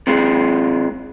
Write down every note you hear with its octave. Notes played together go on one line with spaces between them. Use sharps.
C3 G#3